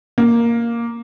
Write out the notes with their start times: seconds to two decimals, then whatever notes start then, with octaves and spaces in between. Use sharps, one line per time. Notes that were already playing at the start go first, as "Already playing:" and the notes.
0.18 A#3